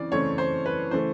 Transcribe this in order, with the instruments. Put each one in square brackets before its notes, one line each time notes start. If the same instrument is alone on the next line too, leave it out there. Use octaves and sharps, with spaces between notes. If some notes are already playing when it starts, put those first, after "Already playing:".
Already playing: [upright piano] C#3 E3 C4 D5
C#3 E3 A3 C4 C#5
C5
B4
C#3 E3 A3 C5